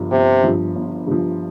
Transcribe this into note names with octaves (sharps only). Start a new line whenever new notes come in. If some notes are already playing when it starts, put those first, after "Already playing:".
Already playing: G1 G2 F3
G1 C3
G2 F3
G1
G2 F3